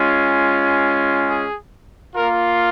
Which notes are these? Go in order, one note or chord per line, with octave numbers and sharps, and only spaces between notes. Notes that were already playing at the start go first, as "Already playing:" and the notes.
Already playing: G#3 C#4 F4
G#4
A#3 F4 A#4